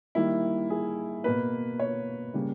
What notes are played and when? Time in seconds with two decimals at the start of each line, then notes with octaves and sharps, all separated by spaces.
0.15 D#3 G3 A#3 E4
0.70 G#4
1.24 B2 A#3 B4
1.79 C#5
2.34 C#3 G3 A#3